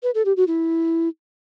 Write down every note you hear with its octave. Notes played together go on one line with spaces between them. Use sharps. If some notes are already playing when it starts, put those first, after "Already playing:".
B4
A4
G4
F#4
E4